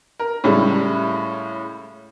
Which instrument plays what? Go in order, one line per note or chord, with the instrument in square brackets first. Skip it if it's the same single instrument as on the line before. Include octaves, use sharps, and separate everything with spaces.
[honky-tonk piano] A#4
A2 C#3 G3 G#3 E4